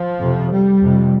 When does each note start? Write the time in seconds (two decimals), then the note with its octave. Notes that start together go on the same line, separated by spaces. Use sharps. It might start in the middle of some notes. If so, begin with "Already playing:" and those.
Already playing: F3
0.21 F2 C3
0.51 G3
0.82 F2 C3